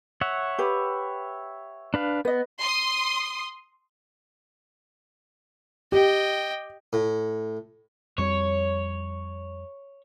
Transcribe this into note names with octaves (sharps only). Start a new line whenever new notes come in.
C#5 E5 F#5
G4 B4
D4 B4 F5
B3 B4 D#5
C6 D#6
G4 D#5 G5
A2
F2 G3 C#5